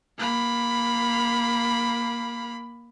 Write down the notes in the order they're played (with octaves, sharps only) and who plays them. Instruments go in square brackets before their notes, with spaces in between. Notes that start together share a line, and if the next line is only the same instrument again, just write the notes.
[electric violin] A#3 B5